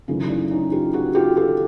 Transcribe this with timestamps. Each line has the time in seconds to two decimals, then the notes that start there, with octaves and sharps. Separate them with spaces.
0.08 F#2 C#3 E3 A3 D#4 F4
0.29 D4 E4
0.50 C#4 D#4
0.72 F4 G4
0.93 F#4 G#4
1.15 F4 G4
1.37 G4 A4